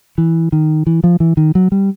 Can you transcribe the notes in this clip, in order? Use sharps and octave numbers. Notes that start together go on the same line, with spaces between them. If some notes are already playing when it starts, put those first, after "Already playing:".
E3
D#3
E3
F3
E3
D#3
F#3
G3